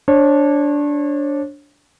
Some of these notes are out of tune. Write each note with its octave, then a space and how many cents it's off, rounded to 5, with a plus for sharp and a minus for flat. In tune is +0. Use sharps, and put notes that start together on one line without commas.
D4 -10 C#5 -35